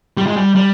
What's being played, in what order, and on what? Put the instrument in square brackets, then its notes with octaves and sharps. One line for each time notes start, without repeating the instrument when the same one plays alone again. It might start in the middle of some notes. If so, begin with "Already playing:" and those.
[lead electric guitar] G3
G#3
G3
G3